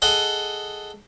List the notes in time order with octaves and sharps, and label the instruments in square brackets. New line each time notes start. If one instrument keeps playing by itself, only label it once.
[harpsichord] G#4 A4 D#5 F#5